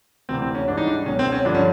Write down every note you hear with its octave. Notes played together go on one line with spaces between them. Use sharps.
D2 C3 E3 C4
C4
C#4
G#2 E3 G3 D4
D#4
D4
C#2 B2 F#3 C#4
C4
C#4
G2 D3 F3 D4
C#4